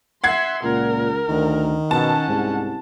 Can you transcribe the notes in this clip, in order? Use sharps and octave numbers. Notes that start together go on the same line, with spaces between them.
E5 F#5 C6 G#6 C7
C#2 A#2 A#4
D2 D#3
B2 C#4 F#5 A5
C2 G#2